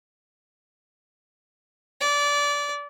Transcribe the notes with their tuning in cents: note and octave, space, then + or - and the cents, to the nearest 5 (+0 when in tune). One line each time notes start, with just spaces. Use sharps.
D5 -25